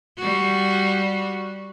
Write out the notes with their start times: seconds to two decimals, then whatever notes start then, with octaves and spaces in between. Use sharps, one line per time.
0.19 G3 F#4